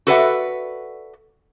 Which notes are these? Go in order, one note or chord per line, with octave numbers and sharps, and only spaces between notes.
F#4 A4 B4 D5 E5 F#5